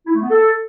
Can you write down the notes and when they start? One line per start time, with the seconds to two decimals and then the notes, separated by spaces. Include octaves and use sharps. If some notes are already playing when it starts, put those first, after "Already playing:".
0.07 E4
0.15 A3
0.22 B3
0.30 A4